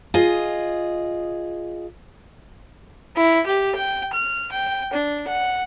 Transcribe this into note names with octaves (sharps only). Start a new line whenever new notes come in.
F4 G#4 D#5
E4
G4
G5
F6
G5
D4
F#5